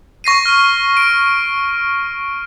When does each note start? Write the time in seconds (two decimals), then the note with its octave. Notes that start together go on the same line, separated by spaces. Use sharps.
0.24 C#6 A#6 C7 D#7
0.45 F6
0.97 D7